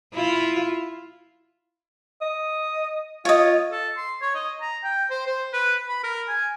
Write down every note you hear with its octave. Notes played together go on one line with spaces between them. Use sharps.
E4 F4
D#5
F4 C#5 D#5
A4
C6
C#5
D#5
A#5
G5
C5
C5
B4
B5
A#4
G#5